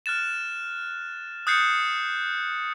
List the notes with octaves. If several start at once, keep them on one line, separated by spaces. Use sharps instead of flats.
F6 F#6 A6 E7
D#6 F#6 G6 A6 C7 C#7